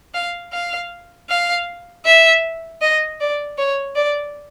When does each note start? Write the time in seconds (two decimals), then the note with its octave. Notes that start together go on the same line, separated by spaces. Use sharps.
0.14 F5
0.53 F5
1.29 F5
2.05 E5
2.82 D#5
3.21 D5
3.58 C#5
3.96 D5